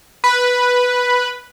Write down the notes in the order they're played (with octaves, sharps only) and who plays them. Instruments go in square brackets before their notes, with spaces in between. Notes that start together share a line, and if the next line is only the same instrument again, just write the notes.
[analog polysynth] B4